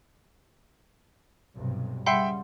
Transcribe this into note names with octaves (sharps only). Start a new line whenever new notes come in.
B1 G2 C3
C#3 G3 E5 F#5 G5 B5 C6 C7